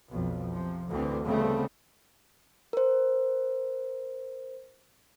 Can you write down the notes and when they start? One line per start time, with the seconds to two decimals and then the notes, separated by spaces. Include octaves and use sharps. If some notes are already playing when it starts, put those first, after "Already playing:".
0.10 B1 F2
0.53 C3 F3
0.89 D2 D3 E3 C4
1.26 C#3 G3 A3 B3 C4
2.73 A#4 C5